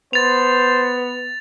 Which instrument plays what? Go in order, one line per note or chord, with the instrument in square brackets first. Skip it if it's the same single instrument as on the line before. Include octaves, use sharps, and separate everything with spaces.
[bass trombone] B3 [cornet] C5 [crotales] A6 F7